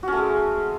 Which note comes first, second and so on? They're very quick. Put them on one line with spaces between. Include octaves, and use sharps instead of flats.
F#4 C#4 A3 G#3